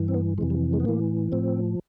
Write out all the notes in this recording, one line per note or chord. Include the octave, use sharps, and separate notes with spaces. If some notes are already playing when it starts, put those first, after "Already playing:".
Already playing: G2 E3
C4
B3
F2 C3 E3 G#3
G3
G#3
B3
A2 E3 A#3
A2 F3 C4